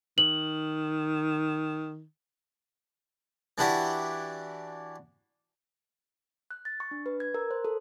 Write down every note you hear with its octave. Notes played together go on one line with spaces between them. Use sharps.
D#3 F#7
E3 D4 E4 F#4 G4
F#6
A6
C#6
D4
B4
G#6
A#4
C5
A4